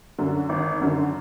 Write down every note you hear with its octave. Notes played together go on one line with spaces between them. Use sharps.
F#2 D3
G#1
F#2 D3